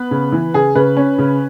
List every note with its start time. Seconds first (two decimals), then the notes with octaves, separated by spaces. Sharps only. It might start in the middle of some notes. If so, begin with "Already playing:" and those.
Already playing: B3 B4
0.11 C#3
0.32 E3
0.54 C#3 G#4
0.75 C#3 B4
0.97 C#4
1.18 C#3